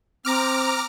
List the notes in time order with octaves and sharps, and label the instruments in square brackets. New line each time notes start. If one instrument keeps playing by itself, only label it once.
[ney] C4 [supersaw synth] A#5 D6 F6